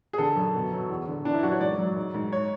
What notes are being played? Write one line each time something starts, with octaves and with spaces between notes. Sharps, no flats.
G#4
D3 A4
F#2
B2
F#3
E2
D3
E3 D4
E4
F#2 F#4
C#5
G#2 D5
F#3
G#2
G#2
C#5